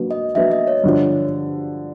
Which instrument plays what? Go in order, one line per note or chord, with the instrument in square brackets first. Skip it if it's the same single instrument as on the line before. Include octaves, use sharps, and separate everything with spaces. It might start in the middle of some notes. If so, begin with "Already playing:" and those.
Already playing: [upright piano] F#3 A#3 D4 F#4 B4
[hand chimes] D#5
[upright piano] F#3 A#3 D4 F#4 B4 [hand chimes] E5
[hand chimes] D#5
C#5
[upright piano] G2 D3 F3